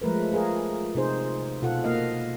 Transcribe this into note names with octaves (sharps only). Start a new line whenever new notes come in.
F3 G#3 A3 A#4 B4
F4 G#4 A#4
C3 D#4 G#4 C5
B2 F4 A4 F#5
A#3 D#5 F5